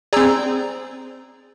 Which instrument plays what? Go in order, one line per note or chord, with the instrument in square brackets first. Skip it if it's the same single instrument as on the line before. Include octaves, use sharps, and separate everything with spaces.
[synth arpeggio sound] C4 G#4 [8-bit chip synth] D5 A#5 E6